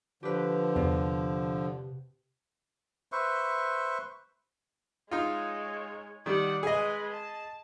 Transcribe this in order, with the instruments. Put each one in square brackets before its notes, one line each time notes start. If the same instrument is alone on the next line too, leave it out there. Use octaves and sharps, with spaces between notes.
[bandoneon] D3 F3 [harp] G4 B4
[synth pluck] E2 [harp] C3
[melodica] B4 C5 E5 C#6
[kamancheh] G#3 C#5 [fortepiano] D#4 F4
[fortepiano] D#3 G3 [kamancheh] D5 F#5
[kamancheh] G#3 B4 [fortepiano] G#4 D#5
[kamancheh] A5